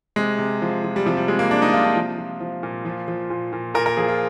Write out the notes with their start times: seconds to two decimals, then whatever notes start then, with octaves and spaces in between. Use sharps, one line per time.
0.16 C3 G#3
0.38 C3
0.62 F3
0.84 F3
0.96 G3
1.06 C3 F3
1.17 G3
1.28 C3 G#3
1.39 A#3
1.51 C3 D4
1.62 D#4
1.73 C3 F4
1.84 D4
1.96 F3
2.18 F3
2.40 F3
2.63 A#2
2.85 F3
3.08 F3
3.30 A#2
3.53 A#2
3.74 A#2 A#4
3.86 A#4
3.97 F3 G#4
4.08 F4